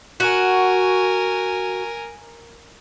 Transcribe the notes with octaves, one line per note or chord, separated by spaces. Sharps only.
F#4 A#4 G#5